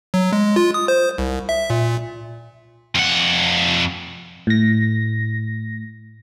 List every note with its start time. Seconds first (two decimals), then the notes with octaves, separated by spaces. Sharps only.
0.14 F#3
0.33 G#3
0.56 F4
0.74 D#6
0.88 C5
1.18 C2
1.49 E5
1.70 A#2
2.95 F2 F#5
4.47 A2 A#6